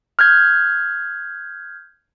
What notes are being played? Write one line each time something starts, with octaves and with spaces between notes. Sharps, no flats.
F6 G6 G#6